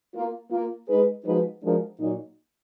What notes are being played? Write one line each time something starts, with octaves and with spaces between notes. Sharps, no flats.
A#3 F4 A#4
A#3 F4 A#4
G#3 D#4 G#4 B4
F3 G#3 D#4 F#4 B4
F3 G#3 D4 F#4 A#4
A#2 F#3 A#3 D#4